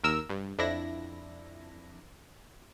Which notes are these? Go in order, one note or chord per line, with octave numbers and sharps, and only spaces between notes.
D#2 A#4 E6
G2
F2 D4 E4 A#6